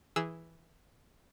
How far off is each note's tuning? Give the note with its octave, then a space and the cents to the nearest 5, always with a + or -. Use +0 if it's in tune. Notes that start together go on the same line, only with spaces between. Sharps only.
E3 +0 G#4 +0 E6 +0